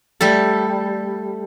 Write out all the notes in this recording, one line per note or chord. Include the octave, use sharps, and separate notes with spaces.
G3 A3 A4